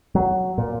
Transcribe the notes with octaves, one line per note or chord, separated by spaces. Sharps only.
F#3
A#2